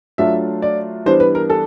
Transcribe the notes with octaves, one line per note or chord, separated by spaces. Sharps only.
F#3 A3 D4 F4 E5
D5
E3 G3 B3 D4 C5
B4
A#4
A4